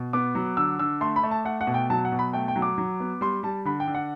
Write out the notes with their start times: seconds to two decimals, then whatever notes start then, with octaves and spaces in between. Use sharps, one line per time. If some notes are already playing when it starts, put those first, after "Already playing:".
Already playing: B2
0.13 B3 D6
0.35 F#3
0.57 D3 E6
0.79 D3 E6
1.01 A3 C6
1.16 B5
1.23 A3
1.31 A5
1.45 A3 F#5
1.61 F#5
1.67 B2
1.74 G5
1.90 F#3 A5
2.05 F#5
2.12 B2
2.19 B5
2.33 A3 G5
2.48 G5
2.56 F#3
2.62 D6
2.78 F#3
3.00 B3
3.21 G3 C6
3.43 G3 A5
3.65 D3 B5
3.80 G5
3.88 D3
3.95 F#5